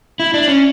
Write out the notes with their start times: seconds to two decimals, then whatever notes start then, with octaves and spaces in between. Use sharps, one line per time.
0.20 E4
0.34 D4
0.48 C#4